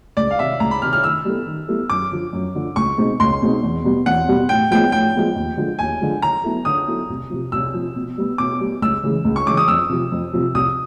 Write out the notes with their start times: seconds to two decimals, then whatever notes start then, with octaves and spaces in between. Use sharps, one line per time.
0.17 C#2 D5
0.31 F5
0.39 C3 D#3 E5
0.60 C#2 A#5
0.71 B5
0.82 C3 D#3 F6
0.93 F6
1.04 D#3 E6
1.25 G3 B3 E4 A4
1.47 D#3
1.68 G3 B3 E4 A4
1.90 F#2 D6
2.12 D3 F3
2.33 F#2
2.55 D3 F3
2.76 C#2 C#6
2.98 B2 G#3 C4 D#4
3.20 C#2 C6
3.42 B2 G#3 C4 D#4
3.63 E2
3.84 B2 G3 B3
4.06 E2 F#5
4.28 B2 G3 B3
4.49 A2 G5
4.71 F3 G#3 B3 G5
4.92 A2 G5
5.15 F3 G#3 B3
5.36 D#2
5.57 D3 F3 G#3
5.79 D#2 G#5
6.01 D3 F3 G#3
6.22 D3 A#5
6.44 F#3 B3 E4 A4
6.65 D3 D#6
6.87 F#3 B3 E4 A4
7.10 C2
7.30 C3 F3
7.52 C2 E6
7.74 C3 F3
7.96 B2
8.18 G3 B3
8.38 B2 D6
8.60 G3 B3
8.82 C#2 E6
9.04 C#3 E3 G#3
9.25 C#2
9.36 C#6
9.46 C#3 E3 G#3 D6
9.57 D#6
9.68 F2 E6
9.90 C3 F3
10.12 F2
10.33 C3 F3
10.55 C2 D#6